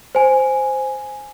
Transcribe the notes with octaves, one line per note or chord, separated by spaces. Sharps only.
C5 G#5